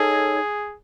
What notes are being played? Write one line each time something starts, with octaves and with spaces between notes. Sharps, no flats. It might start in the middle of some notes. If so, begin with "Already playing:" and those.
Already playing: D#4 G#4 A4 C#5